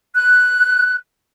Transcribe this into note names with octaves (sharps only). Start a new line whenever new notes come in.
F#6